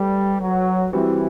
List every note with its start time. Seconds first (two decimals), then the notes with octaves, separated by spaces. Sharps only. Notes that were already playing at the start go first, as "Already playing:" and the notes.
Already playing: G3 A3 B4
0.41 F#3
0.93 E3 G3 C4 F#4